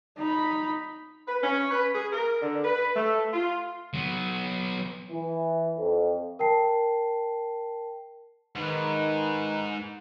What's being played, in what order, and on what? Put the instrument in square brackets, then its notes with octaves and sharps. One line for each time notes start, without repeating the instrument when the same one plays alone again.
[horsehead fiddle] D#4 B5
[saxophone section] B4
C#4
B4
G#4
A#4
D3
B4
A3
F4
[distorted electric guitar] F#3 B3
[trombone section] E3
F2
[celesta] A#4 G5 A5 C7
[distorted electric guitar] G#2 [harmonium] D#3 D#4 B4